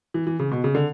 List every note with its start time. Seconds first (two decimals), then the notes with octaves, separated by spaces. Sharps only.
0.14 E3
0.27 E3
0.39 C#3
0.51 B2
0.64 C#3
0.75 D3